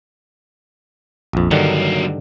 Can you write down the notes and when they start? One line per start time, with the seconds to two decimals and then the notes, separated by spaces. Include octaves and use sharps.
1.33 A#1 F2
1.51 G2 D3 D#3 F#3 A#3